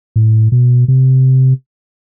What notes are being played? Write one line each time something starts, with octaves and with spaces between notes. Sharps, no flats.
A2
B2
C3